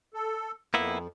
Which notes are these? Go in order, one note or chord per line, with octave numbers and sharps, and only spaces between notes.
A4
F2 A#3 B3 E4